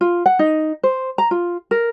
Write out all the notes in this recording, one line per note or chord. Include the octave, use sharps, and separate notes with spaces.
F4
F#5
D#4
C5
A#5
F4
A#4